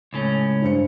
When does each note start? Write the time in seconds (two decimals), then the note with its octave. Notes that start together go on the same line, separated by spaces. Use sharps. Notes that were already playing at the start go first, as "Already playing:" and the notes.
0.13 C#2 A2 C#4
0.62 G2 C5 C#7